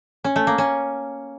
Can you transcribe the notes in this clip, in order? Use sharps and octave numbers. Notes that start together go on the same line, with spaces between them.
C#4
A3
A#3
C#4